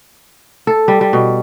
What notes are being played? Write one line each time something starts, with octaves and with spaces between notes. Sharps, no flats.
A4
G3
G3
B2